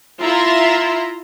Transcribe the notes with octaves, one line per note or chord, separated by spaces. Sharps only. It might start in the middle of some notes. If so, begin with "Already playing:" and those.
E4 F4 E5 A#5 C6